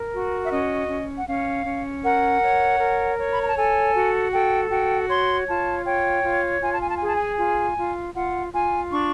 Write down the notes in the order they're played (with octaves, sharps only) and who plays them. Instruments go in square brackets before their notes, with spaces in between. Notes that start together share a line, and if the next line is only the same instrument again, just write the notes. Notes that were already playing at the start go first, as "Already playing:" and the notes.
Already playing: [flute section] A#4
F#4
E5
C#4 D#5
C#4
F#5
C#4 F5
C#4
A#4 F#5
C#5
A#4
C#5
B5
A#5
A5
A4 G#5
F#4
A4 G5
F#4 G5
C#5 C6
F4 A5
C#5 G5
F4
F4 G#5
A5
G#5
A5
G#4 G#5
A5
G#5
F4 G#5
F4
F4 F#5
F4 G#5
D4 C#6